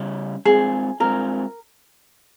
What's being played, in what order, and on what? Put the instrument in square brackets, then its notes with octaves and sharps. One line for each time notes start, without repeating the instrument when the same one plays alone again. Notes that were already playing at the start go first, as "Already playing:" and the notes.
Already playing: [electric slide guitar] C#3 G3 C#4
[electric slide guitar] G#3 C4 F4 [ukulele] G#4
[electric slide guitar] G#3 C4 F4 [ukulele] A#4